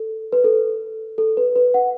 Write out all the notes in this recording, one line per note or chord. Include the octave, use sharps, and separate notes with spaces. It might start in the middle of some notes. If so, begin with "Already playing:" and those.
Already playing: A4
B4
A4
A4
B4
B4
F#5